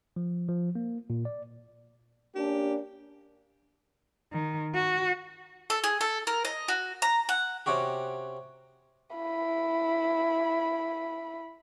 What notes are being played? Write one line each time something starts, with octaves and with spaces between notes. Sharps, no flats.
F3
F3
A#3
A#2
D5
A#3 C#4 D4 G4
D#3
F#4
A4
G#4
A4
A#4
D#5
F#4
A#5
F#5
C3 C#4 F#4 G4
E4 B5